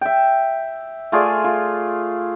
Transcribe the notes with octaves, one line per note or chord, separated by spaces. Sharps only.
E5 G5
A3 F4 G#4 D5
F4